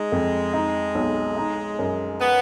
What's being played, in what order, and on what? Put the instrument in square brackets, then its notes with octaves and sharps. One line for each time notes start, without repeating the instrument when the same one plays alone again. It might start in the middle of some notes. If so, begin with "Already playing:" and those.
Already playing: [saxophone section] G#3 [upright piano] D#4
[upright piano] F2
D#4
B1
D#4
F#2
[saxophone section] B3